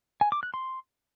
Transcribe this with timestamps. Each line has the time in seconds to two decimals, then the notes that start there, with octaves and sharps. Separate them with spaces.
0.21 G#5
0.32 D6
0.43 F#6
0.54 C6